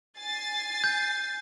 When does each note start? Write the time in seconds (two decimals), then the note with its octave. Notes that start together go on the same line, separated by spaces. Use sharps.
0.18 G#5 A6 C7
0.84 G6